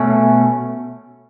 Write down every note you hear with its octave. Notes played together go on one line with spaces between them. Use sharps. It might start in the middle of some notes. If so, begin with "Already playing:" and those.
Already playing: B2 A3 C#4